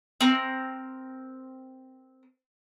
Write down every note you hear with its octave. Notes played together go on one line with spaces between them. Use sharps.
C4 A#4